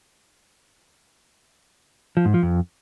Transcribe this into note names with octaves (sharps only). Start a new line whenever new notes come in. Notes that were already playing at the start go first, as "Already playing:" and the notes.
F3
G#2
F3
F2